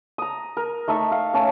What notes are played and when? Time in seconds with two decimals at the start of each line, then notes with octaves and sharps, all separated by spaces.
0.18 A#5 D#6
0.57 A#4
0.88 A3 D#4 A4 E5
1.12 F5
1.33 A3 C#4 C#5 A5